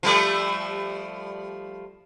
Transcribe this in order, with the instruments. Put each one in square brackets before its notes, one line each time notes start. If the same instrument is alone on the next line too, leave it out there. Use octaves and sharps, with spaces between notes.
[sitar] F3 G3 A3